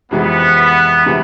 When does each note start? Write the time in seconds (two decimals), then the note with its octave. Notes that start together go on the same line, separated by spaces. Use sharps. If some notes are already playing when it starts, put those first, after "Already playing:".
0.11 F2 C3 E3 G#3 B3
1.06 C3 E3 G#3